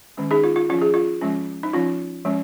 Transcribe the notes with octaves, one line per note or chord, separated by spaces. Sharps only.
D#3 G#3 C#4
D#4 G#4
F4
F4
F3 C#4 F4
G#4
F4
F3 G#3 C#4
D#4
F3 C#4 F4
F3 G#3 C#4